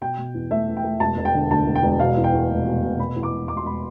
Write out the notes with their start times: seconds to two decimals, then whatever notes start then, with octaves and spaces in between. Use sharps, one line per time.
0.01 B2 G5
0.18 B2
0.34 E2
0.51 A3 E5
0.68 E2
0.77 G5
0.84 A3
1.00 E1 A5
1.17 E1
1.25 G5
1.34 D3
1.50 D2 A5
1.66 E1
1.75 G5
1.83 E1
2.00 B2 F5
2.17 E2
2.24 G5
2.32 E2
2.49 F1
2.66 B2
2.83 B2
2.98 E1 B5
3.16 E2
3.23 D6
3.31 E1
3.48 E1 D6
3.57 C6
3.65 E1 B5